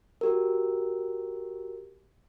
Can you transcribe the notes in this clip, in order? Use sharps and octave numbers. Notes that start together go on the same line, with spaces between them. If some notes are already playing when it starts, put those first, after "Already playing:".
F#4 G4 A#4